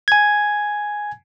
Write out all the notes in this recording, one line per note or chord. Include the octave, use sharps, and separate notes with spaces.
G#5 G#6